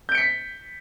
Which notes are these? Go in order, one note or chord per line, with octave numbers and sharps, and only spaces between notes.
G6 B6 C#7 D7